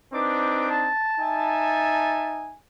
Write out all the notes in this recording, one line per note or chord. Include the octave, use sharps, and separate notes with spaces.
C4 D4 D#4 B4 D6
A5
D#4 E5 G#5